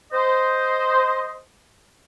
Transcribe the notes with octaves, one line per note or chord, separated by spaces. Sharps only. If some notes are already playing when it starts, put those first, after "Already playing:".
C5 D#5